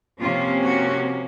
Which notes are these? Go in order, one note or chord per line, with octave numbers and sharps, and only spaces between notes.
C3 F3 A#3 C#4 F4
F#4